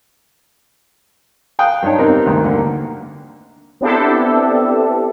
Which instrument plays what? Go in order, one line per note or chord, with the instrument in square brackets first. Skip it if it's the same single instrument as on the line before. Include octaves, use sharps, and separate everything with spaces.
[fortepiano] F5 G5 D#6 F#6
G2 D4 D#4 C#5 A5
B3 C4 D#4 G4 A#4 B4
D2 G2 D#3 A#3
D3 A#3
[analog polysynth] B3 C4 D4 E4 G4 A4